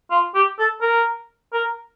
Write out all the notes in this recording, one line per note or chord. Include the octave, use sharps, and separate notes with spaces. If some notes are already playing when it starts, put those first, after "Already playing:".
F4
G4
A4
A#4
A#4